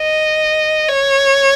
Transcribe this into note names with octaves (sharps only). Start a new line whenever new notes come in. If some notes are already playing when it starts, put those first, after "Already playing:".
Already playing: D#5
C#5